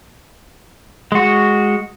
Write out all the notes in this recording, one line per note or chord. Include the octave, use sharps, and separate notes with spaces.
G#3 F#4